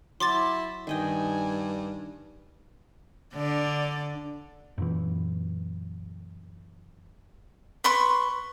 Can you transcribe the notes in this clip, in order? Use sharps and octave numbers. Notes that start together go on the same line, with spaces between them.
F#3 E4 C6 D6 A6
G2 D#3 D#5 G5 G#5
D3 D5
F#2 A#2 E3
B4 C6 C#6